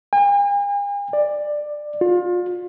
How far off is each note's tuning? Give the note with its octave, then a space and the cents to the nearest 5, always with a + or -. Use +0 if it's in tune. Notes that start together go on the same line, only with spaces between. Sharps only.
G#5 -45
D5 +15
F4 +30